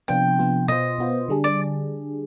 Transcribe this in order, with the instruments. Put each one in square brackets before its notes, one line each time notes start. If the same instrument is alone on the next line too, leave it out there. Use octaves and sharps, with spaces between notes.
[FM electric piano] C3 F3 B3 D4 F4 [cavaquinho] G5
[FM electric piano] C3 F3 B3 D4 F4
[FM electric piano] B2 B3 F4 C5 [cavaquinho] D#5
[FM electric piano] B2 B3 F4 C5
D3 G3 D4 G#4
[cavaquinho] D5